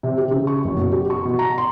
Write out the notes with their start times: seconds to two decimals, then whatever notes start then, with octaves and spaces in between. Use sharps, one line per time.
0.03 C3
0.18 G4
0.31 C#3
0.47 C#6
0.65 F#1
0.77 B2
0.92 G4
1.10 C#6
1.25 B2
1.39 A#5
1.58 C6